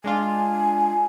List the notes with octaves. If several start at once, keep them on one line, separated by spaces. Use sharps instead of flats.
G#3 D4 F4 G#5